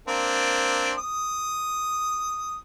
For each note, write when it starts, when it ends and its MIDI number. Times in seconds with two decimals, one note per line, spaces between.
0.08 0.92 58
0.08 0.92 60
0.08 0.92 62
0.98 2.58 87